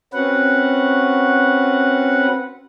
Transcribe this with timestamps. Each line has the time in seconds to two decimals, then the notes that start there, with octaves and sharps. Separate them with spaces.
0.13 C4 C#4 F#4 B4 F#5